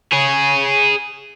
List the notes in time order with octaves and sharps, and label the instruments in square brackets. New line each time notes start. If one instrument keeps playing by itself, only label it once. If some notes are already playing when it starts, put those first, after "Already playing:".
[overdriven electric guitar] G#4 C#5